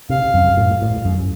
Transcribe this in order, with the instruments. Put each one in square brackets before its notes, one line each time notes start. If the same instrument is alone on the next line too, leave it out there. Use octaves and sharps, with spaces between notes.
[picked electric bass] C3 [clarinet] F5
[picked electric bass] F#2
A2
A2
F#2